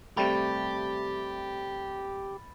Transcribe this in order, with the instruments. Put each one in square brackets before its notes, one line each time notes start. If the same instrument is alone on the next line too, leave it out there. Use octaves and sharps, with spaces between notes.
[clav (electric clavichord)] C3 G3 A3 [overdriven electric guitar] G4 [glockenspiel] B5 A6